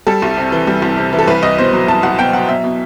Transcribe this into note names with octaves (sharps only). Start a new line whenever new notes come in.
G3 A4
C2
C3
E3
G3
C2
C3
E3
A4
C2 B4
C2 D#5
B2 C5
F#3
C2 A5
C2 F#5
B2 G5
F#3 F#5
B2 E5
B2